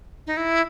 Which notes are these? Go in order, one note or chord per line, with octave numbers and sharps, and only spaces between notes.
D#4
E4